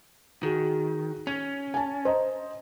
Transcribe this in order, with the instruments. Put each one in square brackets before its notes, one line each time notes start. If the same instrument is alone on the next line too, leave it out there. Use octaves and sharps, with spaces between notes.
[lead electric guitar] D#3 [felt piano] F#4 G#4
[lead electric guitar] C#4 [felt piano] G#6
[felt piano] G#5 A5
C5 D#5 A#5